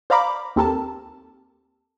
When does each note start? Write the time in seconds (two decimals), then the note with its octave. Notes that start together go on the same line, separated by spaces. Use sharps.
0.10 C5 D5 F5 A#5 B5 D6
0.56 D#2 C4 G4 A4 A#4 A5